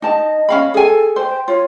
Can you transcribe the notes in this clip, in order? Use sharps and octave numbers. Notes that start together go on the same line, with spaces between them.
D#4 D#5 A5
C#4 F5 B5
G#4 A4 G#5
C5 G5
F4 C#5